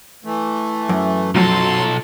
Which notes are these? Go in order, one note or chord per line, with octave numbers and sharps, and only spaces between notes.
E3 A3
F#2
B1 F3 F#3 A4 C6